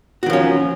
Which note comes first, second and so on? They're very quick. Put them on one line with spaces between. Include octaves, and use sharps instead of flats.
F#4 D#3 F3 C#4